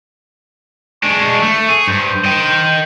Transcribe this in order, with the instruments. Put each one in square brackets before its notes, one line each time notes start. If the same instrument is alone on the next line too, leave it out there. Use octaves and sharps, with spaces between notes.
[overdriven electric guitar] G#3 D4 [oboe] C#6
[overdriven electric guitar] A3
G#4
[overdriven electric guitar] G2 [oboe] C5
[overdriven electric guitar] D#5 G5